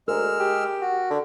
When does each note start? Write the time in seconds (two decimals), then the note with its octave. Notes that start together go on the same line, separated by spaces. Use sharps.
0.08 D2 G#3 A#4 E6 F6
0.39 G4
0.81 F#4
1.10 D3